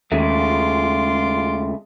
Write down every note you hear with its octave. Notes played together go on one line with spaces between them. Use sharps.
D#2 C#3 G#3 A3 F4 C6 D6